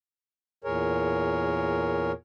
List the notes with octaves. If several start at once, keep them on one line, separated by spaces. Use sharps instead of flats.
E2 A#2 G#4 A#4 C#5